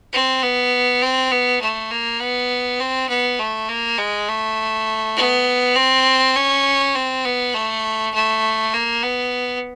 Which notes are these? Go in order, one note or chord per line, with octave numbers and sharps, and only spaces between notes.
C4
B3
C4
B3
A3
A#3
B3
C4
B3
A3
A#3
G#3
A3
B3
C4
C#4
C4
B3
A3
A3
A#3
B3